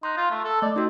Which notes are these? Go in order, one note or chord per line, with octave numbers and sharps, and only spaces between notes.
D#4 C6 F#6
F4
A3
A4
A3 D5 D#5
C4 D#4 F#4